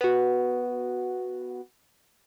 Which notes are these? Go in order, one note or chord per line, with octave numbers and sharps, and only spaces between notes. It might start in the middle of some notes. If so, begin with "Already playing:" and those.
B3 F#4